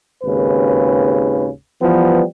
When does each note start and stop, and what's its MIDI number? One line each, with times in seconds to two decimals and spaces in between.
0.24 1.47 32
0.24 1.47 39
0.24 1.47 49
0.24 1.47 71
1.82 2.22 52
1.82 2.22 53
1.82 2.22 55
1.82 2.22 59